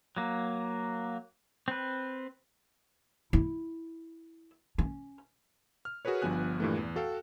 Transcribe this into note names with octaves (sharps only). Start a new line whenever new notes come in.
F#3 A#3
C4 B4
E4
C#4
F6
F#4 G#4 A#4 B4 C#5
G1 G2 F3 B3 G#5 F#6
G2 A#2 E3 G3 A3
E2
F#4 A4 F5 G5